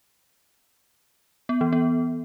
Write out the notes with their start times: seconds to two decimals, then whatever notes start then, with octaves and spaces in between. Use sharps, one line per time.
1.49 B3
1.61 E3
1.73 B3